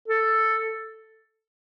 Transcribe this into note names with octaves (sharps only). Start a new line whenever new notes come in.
A4